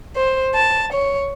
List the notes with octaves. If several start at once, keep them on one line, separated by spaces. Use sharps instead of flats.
C5
A5
C#5